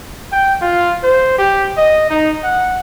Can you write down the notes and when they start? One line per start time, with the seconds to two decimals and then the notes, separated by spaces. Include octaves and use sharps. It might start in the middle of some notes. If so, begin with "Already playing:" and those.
0.32 G5
0.61 F4
1.03 C5
1.38 G4
1.78 D#5
2.10 D#4
2.44 F#5